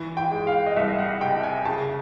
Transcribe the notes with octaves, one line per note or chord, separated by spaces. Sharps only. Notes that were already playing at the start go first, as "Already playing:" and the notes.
Already playing: E3
G5
G#3
F5
D#5
C2 E5
F#5
C3 G5
G#5
C#3 A5